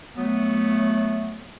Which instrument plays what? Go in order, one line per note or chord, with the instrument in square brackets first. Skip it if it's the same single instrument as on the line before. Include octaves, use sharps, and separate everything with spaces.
[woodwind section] F#3 A3 B3